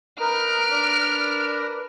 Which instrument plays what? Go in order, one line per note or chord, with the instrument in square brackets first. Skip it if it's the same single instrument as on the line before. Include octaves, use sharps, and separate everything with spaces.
[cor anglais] D#4 [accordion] A#4 B4 [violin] F6 D7
[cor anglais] D4